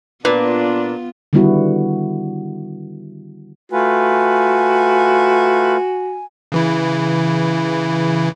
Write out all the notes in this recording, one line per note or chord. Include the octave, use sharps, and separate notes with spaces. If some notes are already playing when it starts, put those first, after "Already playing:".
A#2 B3 D4 F4 B4
D3 D#3 G3 B3 E4 F#4
A3 F4 F#4 B4 G#5
C#3 E3 E4